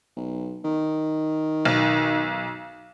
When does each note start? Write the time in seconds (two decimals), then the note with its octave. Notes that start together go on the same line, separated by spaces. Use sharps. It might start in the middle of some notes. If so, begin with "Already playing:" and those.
0.16 B1
0.64 D#3
1.65 B1